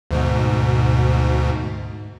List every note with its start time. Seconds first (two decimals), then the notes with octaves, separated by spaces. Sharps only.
0.11 D2 G#2 B2